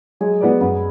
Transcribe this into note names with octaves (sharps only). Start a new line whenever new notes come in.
F#3 G#3 G#4
B3 F#4 B4 D5
F#2 B3